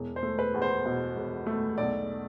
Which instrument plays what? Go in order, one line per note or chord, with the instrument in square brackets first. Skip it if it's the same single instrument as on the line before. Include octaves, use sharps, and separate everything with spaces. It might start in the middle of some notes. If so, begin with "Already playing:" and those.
Already playing: [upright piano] E1
C5
A3
B4
E2
C5
B2
E1
A3
B1 D5